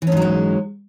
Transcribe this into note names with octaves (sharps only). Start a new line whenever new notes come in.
G#2 E3 F#3 G#3 C#4